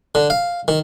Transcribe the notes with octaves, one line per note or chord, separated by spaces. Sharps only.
D3
F5
D#3